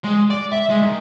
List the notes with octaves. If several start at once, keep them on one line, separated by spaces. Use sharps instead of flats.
G#3
D5
E5
G#3
D#3